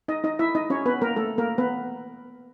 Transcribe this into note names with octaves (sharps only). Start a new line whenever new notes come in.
D#4 D#5
D#4 D#5
E4 E5
D#4 D#5
C#4 C#5
B3 B4
A#3 A#4
A3 A4
A#3 A#4
B3 B4